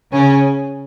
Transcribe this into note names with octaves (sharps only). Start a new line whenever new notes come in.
C#3 C#4